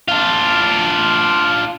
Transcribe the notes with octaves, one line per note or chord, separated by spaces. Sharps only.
D4 F4